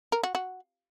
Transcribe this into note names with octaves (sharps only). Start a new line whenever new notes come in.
A#4
F#4
F#4